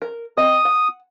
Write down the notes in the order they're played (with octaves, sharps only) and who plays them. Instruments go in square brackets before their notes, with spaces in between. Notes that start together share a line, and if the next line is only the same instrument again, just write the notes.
[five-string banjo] A#4
[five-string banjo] C4 D#5 [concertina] D#6
[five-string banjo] F#5